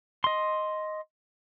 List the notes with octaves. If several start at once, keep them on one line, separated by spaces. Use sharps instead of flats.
D#5 C6